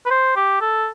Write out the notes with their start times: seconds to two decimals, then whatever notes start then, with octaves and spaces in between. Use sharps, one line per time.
0.06 B4
0.10 C5
0.36 G4
0.61 A4